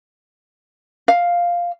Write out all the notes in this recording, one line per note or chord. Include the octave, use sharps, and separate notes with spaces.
F5